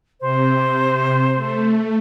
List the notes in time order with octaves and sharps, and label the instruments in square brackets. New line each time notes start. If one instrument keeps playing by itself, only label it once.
[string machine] C3 [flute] C5
[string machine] A3